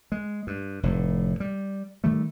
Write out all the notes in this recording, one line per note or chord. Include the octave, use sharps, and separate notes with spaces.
G#3
G2
F1 A2
G3
D#3 G3 A3